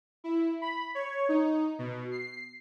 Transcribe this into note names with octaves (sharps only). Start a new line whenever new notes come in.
E4
B5
C#5
D#4
B2
C7